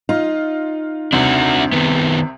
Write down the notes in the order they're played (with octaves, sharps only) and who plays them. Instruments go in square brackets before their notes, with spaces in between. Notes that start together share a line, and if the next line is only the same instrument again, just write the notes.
[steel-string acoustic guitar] D#4 [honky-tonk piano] F4
[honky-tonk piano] C2 C3 [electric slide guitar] D4 F#4
[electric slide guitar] D#3 B3